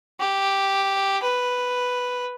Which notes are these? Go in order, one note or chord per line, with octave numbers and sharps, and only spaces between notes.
G4
B4